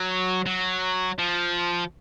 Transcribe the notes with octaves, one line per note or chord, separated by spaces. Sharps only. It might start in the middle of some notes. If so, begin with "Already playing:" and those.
Already playing: F#3
F#3
F3